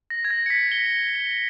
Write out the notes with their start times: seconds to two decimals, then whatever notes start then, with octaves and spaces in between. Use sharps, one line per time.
0.10 A#6
0.25 G#6
0.31 A#6
0.46 C#7
0.50 B6
0.72 G7